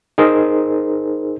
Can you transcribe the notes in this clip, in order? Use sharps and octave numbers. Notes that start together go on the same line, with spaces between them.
D#4 G#4 A#4 C5